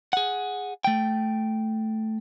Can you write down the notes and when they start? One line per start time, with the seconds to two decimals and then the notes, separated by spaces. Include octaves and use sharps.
0.13 G#4 F#5
0.84 A3 G5